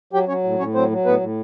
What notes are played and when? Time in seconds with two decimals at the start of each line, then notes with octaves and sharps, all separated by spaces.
0.13 F#3 G4 G5
0.28 F#3 C#4 C#5
0.44 A2
0.59 A2 C#4 C#5
0.74 F#3 C4 C5
0.90 F#3
1.06 A2 B3 B4
1.20 A2